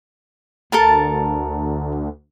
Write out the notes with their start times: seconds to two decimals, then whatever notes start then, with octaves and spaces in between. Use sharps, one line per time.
0.72 D2 A4 A#4 A5